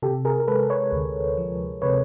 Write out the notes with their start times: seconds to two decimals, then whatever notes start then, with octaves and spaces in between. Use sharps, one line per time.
0.02 C3 G4 A4
0.25 G#4 A#4
0.40 A#4
0.48 G#3 A4 B4
0.70 B4 C#5
0.92 D2
1.38 F3
1.82 C3 B4 C#5